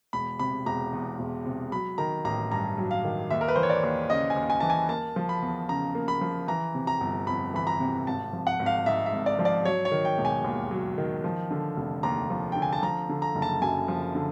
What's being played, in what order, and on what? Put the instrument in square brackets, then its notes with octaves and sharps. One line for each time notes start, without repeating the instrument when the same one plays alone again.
[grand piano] E1 B5
C3 B5
E1 A#5
E2
E1
C3
F#3 B5
D#3 A#5
A1 A#5
G2 A#5
F#3
F5
D#3
D#2 E5
A#4
B4
E3 C5
C#5
D5
D#2
C#3 D#5
G#5
D#2
G#5
E3 A5
G#5
A#3 A5
F3
B5
E2
C#3 A#5
A#3
B5
F3
E3 A#5
C3
A#5
G1
F2 B5
E3 B5
A#5
C3
G#1 A5
F3
F#5
G#1
F5
G#2 E5
E5
G#1
D5
F3
D5
F#3 C#5
C#5
D#3
G5
E1
G#5
D#2
F#3
D#3
F3
D3
F1
D#2 A#5
F3
D3 G5
G#5
A5
F3 A#5
D3
A#5
F#1
A5
F#2 G#5
F3
D3